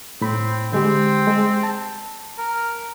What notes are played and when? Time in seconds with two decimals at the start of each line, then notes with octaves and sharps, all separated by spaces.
0.21 A2 C4 B5
0.72 D3 G#3 C4 G4
1.27 G#3
1.63 A5
2.38 A#4